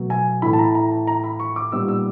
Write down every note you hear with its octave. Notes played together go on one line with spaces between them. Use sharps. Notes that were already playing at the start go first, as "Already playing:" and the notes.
Already playing: B2 F#3 A3
G#5
A2 E3 A3 B5
A5
A#5
A#5
A5
A#5
B5
C#6
D6
A#2 G3 B3 D#4 E6
E6